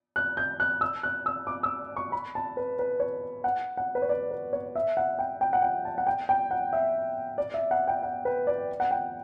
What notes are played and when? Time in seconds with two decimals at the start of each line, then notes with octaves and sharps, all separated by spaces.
0.16 F#6
0.37 G6
0.60 F#6
0.81 E6
1.03 F#6
1.26 E6
1.47 D6
1.63 E6
1.97 C#6
2.12 B5
2.35 A5
2.57 B4
2.79 B4
3.00 C#5
3.44 F#5
3.77 F#5
3.95 B4
4.02 C#5
4.09 D5
4.31 B4
4.53 C#5
4.76 E5
4.97 F#5
5.19 G5
5.41 G5
5.53 F#5
5.62 G5
5.85 A5
5.98 F#5
6.07 G5
6.29 G5
6.51 F#5
6.73 E5
7.38 D5
7.54 E5
7.71 F#5
7.88 G5
8.03 F#5
8.25 B4
8.47 D5
8.80 F#5
8.91 G5